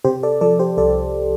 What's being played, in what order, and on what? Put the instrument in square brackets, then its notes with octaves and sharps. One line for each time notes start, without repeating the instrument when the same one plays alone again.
[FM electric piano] C3 G4 C5
A4 D5
F3 A4 D5
G4 C5
C2 A4 D5